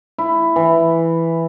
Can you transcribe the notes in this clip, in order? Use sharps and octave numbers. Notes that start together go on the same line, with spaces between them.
E4
E3